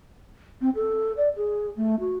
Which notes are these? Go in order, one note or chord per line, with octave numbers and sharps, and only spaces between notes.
C4
A4
D5
G#4
A3
F#4